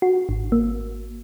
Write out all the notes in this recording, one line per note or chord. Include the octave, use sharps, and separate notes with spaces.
F#4
G#1
A#3